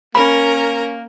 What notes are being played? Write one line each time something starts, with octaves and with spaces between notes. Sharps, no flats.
A#3 C#4 A#4 B5